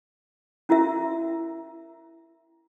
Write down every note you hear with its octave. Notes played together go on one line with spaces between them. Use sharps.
C#4 E4 F#4 A#4 E5 A#5